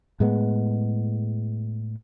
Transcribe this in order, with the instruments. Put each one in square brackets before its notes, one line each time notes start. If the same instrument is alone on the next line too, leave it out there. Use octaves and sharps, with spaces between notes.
[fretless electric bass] A2 G#3 B3